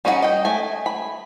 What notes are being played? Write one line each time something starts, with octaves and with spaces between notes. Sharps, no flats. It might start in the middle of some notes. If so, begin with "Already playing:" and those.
G3 C#4 D#4 F#4 F#5
D#5 G5
A3 G#5
B5